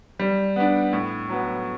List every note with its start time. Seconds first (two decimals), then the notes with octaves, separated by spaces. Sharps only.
0.19 G3
0.56 B3 D4
0.93 A2
1.29 F#3 B3